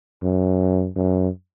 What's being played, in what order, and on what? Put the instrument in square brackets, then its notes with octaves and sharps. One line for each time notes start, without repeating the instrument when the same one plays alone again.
[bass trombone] F#2
F#2